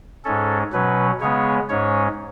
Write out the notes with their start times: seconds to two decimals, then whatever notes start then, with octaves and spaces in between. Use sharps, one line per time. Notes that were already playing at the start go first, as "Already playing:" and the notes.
0.25 G#2 G#3 C#4 A4
0.73 B2 F#3 C#4 B4
1.21 C#3 G#3 B3 C#5
1.69 G#2 G#3 C#4 C#5